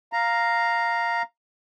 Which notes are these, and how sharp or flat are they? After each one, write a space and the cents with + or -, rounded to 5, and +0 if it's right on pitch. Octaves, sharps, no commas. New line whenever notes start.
F5 +0 A#5 +0